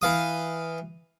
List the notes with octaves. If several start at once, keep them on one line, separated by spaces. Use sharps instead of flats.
E3 F5 D#6